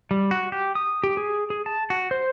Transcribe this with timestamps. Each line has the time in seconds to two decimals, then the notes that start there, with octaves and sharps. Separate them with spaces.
0.11 G3
0.31 F#4
0.52 G4
0.75 D#6
1.04 G4
1.17 G#4
1.50 G#4
1.66 A5
1.90 F#4
2.11 C5